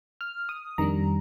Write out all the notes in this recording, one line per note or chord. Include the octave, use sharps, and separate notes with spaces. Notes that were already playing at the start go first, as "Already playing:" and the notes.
F6
D#6
F2 D#3 G3 D4 A#5